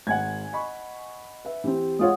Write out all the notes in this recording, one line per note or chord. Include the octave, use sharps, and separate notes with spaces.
G#1 F#5 G#5 G#6
D#5 B5 C#6
B4 E5
E3 C4 G4
G#3 F4 C#5 F#5 D#6